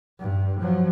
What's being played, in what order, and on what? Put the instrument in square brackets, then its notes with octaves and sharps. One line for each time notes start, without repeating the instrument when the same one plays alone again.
[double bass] G2
F3 F#3